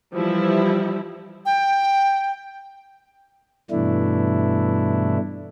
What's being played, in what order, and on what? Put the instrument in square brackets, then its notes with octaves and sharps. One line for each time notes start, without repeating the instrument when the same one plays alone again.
[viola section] E3 F3 G3 E4
[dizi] G5
[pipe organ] G2 B2 E3 A3 D4 E4